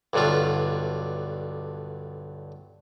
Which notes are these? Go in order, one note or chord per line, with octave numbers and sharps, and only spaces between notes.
B1 G2 D3 F#3 F4